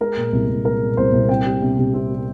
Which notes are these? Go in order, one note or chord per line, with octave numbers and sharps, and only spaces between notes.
G#3 A#4
A#2
C2
C2
G#3 A#4
A#2
C2 C5
C2
C4 G5
G3
C3
C3
C4
G3